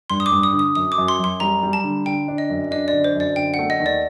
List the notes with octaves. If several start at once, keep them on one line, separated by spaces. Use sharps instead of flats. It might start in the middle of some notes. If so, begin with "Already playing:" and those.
G2 C6
D#6
D6
G2
D#6
D3
D#6
F#2 D#6
D6
F#2
C6
F#2 C6
G3 A#5
G3
A5
D3
D3 G5
D4
D#5
F#2
D4 D#5
D5
D3
C5
F#2
D5
D3 G5
F#5
A3
D#5
D#2
D5